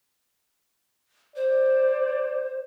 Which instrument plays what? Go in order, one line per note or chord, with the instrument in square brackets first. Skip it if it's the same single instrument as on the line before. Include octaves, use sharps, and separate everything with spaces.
[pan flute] C5 [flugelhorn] D5